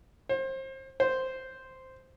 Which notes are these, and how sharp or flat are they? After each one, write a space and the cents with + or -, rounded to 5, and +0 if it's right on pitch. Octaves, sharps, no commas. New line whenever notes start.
C5 +30
C5 -5